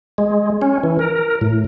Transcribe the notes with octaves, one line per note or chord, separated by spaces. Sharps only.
G#3
C#4
E3
A#4
A2